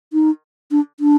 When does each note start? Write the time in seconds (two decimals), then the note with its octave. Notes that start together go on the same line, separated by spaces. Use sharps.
0.13 D#4
0.71 D4
1.00 D4